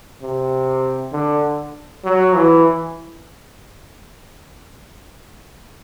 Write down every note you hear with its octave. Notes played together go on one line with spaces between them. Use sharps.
C3
D3
F#3
E3